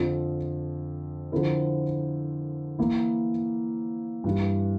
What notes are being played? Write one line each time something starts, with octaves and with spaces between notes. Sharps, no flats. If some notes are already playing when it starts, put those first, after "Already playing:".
Already playing: F2 D3 F3
D3 F3 C4 E4 A#4
E3 A#3 E4
G2 E3 G3